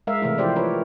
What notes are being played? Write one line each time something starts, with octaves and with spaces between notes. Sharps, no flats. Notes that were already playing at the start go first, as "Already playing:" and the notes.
G#3 A#4 E5 F5
C3 E3 A3 E4
F3 E4 G4 C5 D5
C4 A#4 B4 C#5